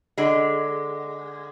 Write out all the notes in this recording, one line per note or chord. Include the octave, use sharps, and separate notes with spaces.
D3 G#3